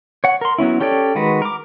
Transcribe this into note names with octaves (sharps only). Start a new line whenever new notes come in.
C#5 F#5
A#4 C6
F#3 B3 C#4 E4
C#4 G4 A4 C#5 D5
D#3 G#3 F#4 B4
A#4 D6